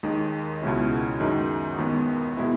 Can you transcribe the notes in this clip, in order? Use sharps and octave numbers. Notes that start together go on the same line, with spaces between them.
D#2 D#3 G#3 D#4
C#2 B2 G#3 C#4 E4
F#2 D#3 G#3 D#4
D#2 D#3 G#3 B3
B2 G#3 B3 E4